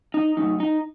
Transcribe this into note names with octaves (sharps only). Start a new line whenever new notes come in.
D#4
F#3 A3 D#4
D#4